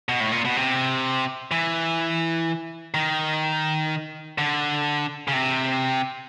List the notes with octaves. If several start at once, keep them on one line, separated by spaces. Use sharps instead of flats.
B2
A2
A#2
B2
C3
E3
D#3
D3
C#3
C3